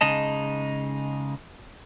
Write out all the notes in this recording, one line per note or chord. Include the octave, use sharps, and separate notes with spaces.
C#3 G#3 D#4 D#5 A5